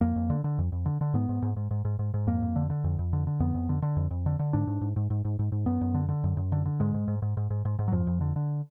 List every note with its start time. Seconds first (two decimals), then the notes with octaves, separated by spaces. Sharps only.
0.01 F2 A#3
0.16 F2
0.30 D3
0.44 D3
0.58 F2
0.72 F2
0.86 D3
1.01 D3
1.14 G#2 B3
1.29 G#2
1.42 G#2
1.57 G#2
1.71 G#2
1.85 G#2
1.99 G#2
2.14 G#2
2.27 F2 A#3
2.42 F2
2.56 D3
2.70 D3
2.84 F2
2.99 F2
3.13 D3
3.27 D3
3.40 F2 B3
3.54 F2
3.69 D3
3.82 D3
3.97 F2
4.11 F2
4.26 D3
4.39 D3
4.53 G#2 D4
4.67 G#2
4.81 G#2
4.96 G#2
5.10 G#2
5.25 G#2
5.39 G#2
5.52 G#2
5.66 F#2 B3
5.81 F#2
5.94 D3
6.09 D3
6.24 F#2
6.37 F#2
6.52 D3
6.66 D3
6.80 G#2 G#3
6.94 G#2
7.08 G#2
7.22 G#2
7.37 G#2
7.50 G#2
7.65 G#2
7.79 G#2
7.88 F#3
7.92 F2 F3
8.07 F2
8.21 D3
8.36 D3